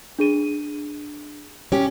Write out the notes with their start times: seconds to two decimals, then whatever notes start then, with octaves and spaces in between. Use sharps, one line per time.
0.19 D4 G#4 D#7
1.72 C#4 G4